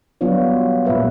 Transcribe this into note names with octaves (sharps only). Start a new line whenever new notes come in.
F#3 G3 B3 D4 F4 C#5
A#2 G#3 B4 E5